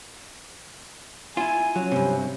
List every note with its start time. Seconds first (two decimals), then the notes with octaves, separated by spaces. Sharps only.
1.37 E4 F4 G#5
1.76 F#3 C#4
1.92 G2 C3